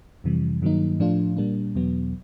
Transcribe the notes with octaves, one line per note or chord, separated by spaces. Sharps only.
F2 C3 E3 G3
G2 D#3 F#3 A#3 D#4
A2 F3 A3 D4 F4
A#2 G3 A#3 D4
E2 B2 F#3 B3